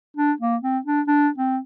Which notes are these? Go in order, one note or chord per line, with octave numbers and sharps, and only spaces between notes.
D4
A#3
C4
D4
D4
C4